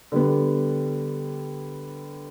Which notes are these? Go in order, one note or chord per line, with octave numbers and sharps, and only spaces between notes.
D3 G3 B3